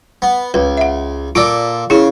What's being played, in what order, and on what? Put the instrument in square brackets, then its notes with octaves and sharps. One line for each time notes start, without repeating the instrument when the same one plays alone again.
[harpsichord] B3
[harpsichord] C#2 [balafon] B4
[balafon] E5 F#5
[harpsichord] A#2 A4 D6 [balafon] F4 D5
[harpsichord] C#3 [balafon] E4 G#4